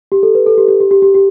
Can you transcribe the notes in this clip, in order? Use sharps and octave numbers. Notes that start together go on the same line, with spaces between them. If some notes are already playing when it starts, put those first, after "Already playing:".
G4
A4
B4
A4
G4
G4
G4
G4
G4
G4